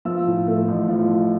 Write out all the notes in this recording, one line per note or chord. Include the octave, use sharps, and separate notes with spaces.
F3 E6
A2
A3
A1
F3
A2